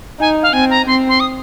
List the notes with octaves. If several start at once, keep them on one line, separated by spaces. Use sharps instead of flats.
D#4 G#5
F5
C4 G#5
A#5
C4 C6
C6
D#6